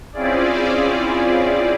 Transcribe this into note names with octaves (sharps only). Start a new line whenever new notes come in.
C4 C#4 E4 F4 G#4 D5